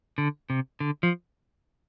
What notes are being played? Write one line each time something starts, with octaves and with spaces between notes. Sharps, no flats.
D3
C3
D3
F3